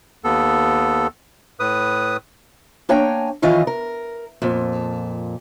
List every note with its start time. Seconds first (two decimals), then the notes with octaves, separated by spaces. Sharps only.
0.24 D#2 B3 A4
1.60 A2 B4 D#6
2.89 A#3 D4 C#5 G5 G#5 A#5
3.42 F#2 D#3 E3 F4 D#5
3.67 A#4
4.42 F2 A#2